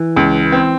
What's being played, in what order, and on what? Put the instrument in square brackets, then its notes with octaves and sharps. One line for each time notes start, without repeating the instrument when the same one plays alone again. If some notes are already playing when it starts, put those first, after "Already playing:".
Already playing: [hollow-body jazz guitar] E3
[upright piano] C#2
C4